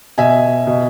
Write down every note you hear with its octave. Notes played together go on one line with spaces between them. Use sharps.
B2 E5 G#5
B2